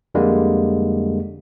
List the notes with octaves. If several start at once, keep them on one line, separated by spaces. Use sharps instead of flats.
F2 D3 G3 G#3 A#3